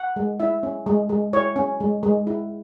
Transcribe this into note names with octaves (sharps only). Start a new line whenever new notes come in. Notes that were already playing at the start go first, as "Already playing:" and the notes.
Already playing: F#5
G#3
E4 E5
C#4
G#3
G#3
E4 C#5
C#4
G#3
G#3
E4